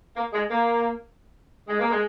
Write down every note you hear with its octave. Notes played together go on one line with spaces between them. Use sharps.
A#3
G#3
A#3
G#3
A#3
G#3